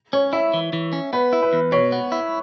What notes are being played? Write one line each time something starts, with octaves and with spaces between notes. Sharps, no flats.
C#4 C#5
E4 E5
E3
E3
C#4
B3 B4
E4
B4
E2
B2 C#5
B3
E4